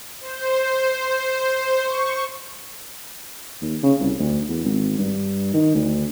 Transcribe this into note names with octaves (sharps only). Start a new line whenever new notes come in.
C5
C#6
D#2
C#3
C2
D2
E2
G#1
G2
D#3
D2